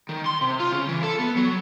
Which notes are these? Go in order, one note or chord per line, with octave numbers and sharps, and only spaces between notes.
D#3
C6
C3
F4
C#3
E3
A4
B3
F#3